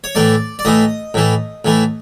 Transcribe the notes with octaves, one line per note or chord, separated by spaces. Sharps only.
C#5
A2 E3 A3 D5
D5
A2 E3 A3 D#5
A2 E3 A3
A2 E3 A3